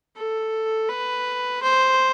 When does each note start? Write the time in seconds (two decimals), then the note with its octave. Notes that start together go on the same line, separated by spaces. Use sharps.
0.16 A4
0.89 B4
1.63 C5